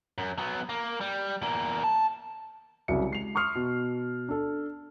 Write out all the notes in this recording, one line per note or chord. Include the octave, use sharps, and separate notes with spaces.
F#2
F#3 B3
A#3
G3
E2 A#3
A5
C2 C#3 F#3 E5 C#7
G#3 C7 F7
C6 C#6 D#6 F6 C7
B2
D4 A4